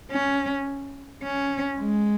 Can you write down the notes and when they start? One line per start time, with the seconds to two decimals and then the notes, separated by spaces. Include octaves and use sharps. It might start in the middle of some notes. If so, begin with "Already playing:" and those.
0.11 C#4
1.23 C#4
1.79 G#3